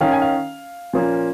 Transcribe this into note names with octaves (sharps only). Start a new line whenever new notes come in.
D#3 C#4 F5
G#5
F5
A#2 F3 A#3 C#4